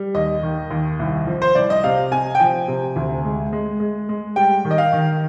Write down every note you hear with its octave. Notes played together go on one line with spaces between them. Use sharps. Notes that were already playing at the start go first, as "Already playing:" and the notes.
Already playing: G3
D#2 D#5
D#3
D#2
C2
F3
C5
C2 D5
D#5
C3 F5
C3 G#5
G5
F3 G#5
C3
D2
G#3
G#3
G#3
G#3
G3 G5
D#3
D#5
F5
D#3